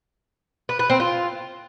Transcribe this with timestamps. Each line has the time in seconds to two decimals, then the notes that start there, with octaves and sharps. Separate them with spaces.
0.69 B4
0.79 B4
0.90 C4
1.00 F4